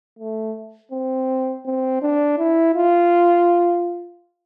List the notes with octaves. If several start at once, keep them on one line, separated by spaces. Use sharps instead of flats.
A3
C4
C4
D4
E4
F4